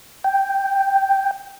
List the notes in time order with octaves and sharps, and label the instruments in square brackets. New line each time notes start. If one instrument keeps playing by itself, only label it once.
[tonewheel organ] G5